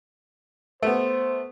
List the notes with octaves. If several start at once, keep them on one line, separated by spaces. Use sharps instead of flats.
A3 B3 C5